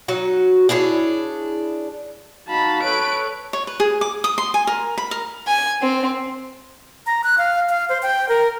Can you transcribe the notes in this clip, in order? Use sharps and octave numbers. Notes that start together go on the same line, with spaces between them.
F#3 D#4 F#4
D4 E4 G#4 C#5
D#4 F#4 F5 A5 B5
A4 B4 C#5 D7
C#5
B4
G#4
D6
D#6
C6
G#5
A#4
B5
A#4
G#5
C4
A#5
F#6
F5
F5
C5
G5
A#4